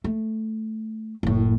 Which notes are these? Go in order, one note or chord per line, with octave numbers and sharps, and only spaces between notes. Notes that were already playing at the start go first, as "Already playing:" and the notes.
A3
F#1 A2